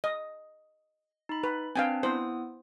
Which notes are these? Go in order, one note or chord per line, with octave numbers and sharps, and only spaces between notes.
D#5
D#4 B5
B4
C4 D4 B4 F5 G5 G#5
B3 E4 C5 D#6